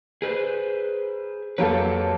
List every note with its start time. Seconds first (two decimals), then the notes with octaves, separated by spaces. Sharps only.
0.22 G#4 B4 C5
1.58 F2 F#3 A#3 G4 A4 B4